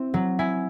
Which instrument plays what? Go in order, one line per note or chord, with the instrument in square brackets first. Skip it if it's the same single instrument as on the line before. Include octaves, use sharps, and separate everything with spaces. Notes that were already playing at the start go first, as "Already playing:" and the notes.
Already playing: [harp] C4 E4
F#3
E4 G#5